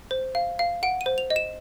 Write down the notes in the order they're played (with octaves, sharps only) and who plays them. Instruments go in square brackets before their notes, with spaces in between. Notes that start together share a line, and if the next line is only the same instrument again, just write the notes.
[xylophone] C5
F5
F5
F#5 D7
D#7
C5
F7
D#5
E7